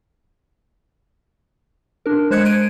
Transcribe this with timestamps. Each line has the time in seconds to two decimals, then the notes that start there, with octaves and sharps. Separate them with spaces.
2.06 D4 A#4
2.31 G#3 C5 F#6 G#6 C#7
2.44 F#6 G#6 D7 D#7